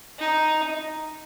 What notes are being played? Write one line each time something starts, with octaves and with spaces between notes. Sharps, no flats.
D#4